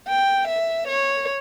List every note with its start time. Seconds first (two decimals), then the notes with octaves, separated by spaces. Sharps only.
0.09 G5
0.48 E5
0.88 C#5